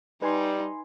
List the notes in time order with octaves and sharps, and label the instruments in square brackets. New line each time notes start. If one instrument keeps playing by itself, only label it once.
[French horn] G3 [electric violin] D#4 [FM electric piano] B4 G#5 C6